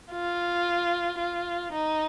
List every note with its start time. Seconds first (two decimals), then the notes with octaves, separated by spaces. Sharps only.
0.12 F4
1.19 F4
1.73 D#4